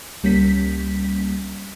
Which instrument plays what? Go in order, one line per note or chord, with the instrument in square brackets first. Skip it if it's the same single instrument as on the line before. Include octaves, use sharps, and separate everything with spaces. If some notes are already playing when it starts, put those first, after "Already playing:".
[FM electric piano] C#2 G3 A#3 C#4 B6